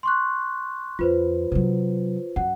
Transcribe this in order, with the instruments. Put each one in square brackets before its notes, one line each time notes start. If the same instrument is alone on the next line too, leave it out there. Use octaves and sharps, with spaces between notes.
[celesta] C6 C#6 F#6
[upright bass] F2 [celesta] F4 B4 C5
[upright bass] C3 F#3
[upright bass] F#2 [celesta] F#5